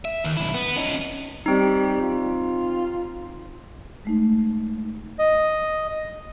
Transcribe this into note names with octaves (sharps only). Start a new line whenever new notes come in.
E5
D#2
B1 E4
B3
C#4 D#4
G3 C4 D#4
F4
G#3 A3 D#4
D#5